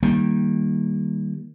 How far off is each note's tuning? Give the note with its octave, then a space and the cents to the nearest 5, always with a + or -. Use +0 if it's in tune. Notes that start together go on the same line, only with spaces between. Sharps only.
D#3 +0 G3 +0 A#3 +0